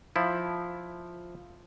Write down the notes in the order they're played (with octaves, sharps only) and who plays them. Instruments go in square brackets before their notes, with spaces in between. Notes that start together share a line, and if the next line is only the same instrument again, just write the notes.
[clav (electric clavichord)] F3 E4